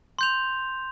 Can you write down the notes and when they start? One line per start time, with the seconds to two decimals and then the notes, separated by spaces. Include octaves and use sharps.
0.19 C6 G6 F7